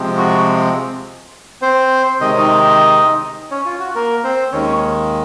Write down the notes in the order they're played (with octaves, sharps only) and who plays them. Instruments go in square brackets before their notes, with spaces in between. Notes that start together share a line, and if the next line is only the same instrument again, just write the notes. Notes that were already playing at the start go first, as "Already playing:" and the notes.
Already playing: [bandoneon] C3 F3 G#3 C4
F#4
C4 C5
C3 D#3 G#3 C4 D#5
C#5
D#4 D#5
C#4 C#5
F4
F#4
A#3 A#4
C4 C5
D#2 D#3 G#3 C#4 C#5